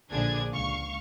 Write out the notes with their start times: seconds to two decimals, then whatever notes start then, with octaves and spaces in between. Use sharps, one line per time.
0.10 A#1 D3 D4 G#4 G#6
0.52 C#2 F5 C#6